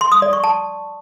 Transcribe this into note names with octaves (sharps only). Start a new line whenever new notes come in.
C6
D#6
D5
C#6
A5